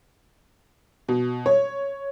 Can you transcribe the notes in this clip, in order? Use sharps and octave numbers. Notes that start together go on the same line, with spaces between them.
B2
C#5